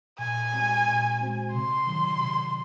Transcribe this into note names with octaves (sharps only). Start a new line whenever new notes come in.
A#2 G#5
G#3 C4 F#4 C5
A#2
G#3 C4 F#4 C5
C3 C6
D#3 F#3
C3